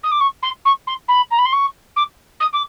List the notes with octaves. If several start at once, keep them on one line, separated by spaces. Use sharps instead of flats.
D#6
D6
C#6
C6
C#6
C6
B5
A#5
B5
C6
C#6
D6
D#6
D6